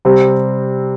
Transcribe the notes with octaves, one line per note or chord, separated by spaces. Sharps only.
C3 G3 C4